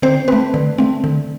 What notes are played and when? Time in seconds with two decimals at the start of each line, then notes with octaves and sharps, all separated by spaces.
0.02 D3 C4 C5
0.28 A3 C4 B4
0.54 D3
0.78 A3 C4
1.04 D3